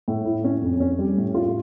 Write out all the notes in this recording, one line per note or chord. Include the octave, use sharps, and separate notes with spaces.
A2
E4
C#4
F2
C#4
G3
A2
F4